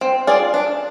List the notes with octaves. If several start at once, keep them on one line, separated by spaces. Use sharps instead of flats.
C4
F4 G#4 D5
D4